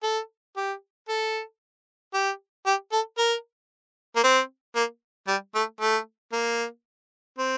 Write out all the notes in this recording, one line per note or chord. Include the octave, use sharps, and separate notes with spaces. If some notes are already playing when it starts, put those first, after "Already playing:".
A4
G4
A4
G4
G4
A4
A#4
A#3
C4
A#3
G3
A3
A3
A#3
C4